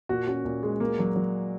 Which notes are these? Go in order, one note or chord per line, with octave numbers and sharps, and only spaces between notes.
A#2 F#4
C#4 F#4
A#2
G#3
A#3
F#3
F#3